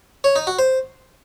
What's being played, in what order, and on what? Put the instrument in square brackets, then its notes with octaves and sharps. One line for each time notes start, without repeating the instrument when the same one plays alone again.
[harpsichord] C#5
D#4
F#4
C5